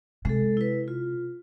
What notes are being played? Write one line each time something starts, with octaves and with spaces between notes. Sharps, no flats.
C3 G#3 A4
E4 B4
F4